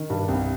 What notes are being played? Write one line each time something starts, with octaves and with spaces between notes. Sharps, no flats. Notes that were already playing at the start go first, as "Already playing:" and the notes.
Already playing: D#3
G2
C2